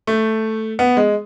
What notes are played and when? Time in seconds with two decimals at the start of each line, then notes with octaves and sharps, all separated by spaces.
0.07 A3
0.79 B3
0.97 G#3